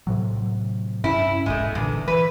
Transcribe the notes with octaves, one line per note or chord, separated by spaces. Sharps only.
A2 C3 F#3
G2 C3 C#4 E4
F1 B1 G#2 G#3 A3
E2 G2 A#2 D3
E3 B4